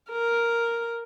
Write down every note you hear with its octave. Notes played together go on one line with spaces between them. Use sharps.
A#4